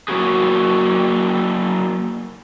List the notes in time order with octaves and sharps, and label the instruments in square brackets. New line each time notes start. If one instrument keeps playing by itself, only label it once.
[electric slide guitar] F#3 A#3 E4 F#4 G#4